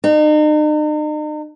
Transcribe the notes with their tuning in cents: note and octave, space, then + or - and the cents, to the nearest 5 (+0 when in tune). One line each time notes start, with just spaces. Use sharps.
D#4 -40